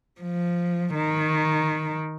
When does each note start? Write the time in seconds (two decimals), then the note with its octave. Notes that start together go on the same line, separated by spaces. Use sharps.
0.21 F3
0.94 D#3